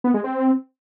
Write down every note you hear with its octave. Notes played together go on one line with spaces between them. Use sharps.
B3
G#3
C4